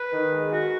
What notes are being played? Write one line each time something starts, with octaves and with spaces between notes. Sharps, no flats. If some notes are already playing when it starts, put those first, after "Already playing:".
Already playing: B4
D#3
G#3
F#4